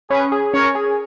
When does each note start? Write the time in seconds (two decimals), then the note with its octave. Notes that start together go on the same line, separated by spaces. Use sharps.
0.10 C#4 G#4 B4
0.32 G#4
0.54 C#4 A#4 C#5
0.75 G#4